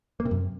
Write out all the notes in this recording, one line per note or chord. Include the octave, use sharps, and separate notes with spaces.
A#3
C3
F#2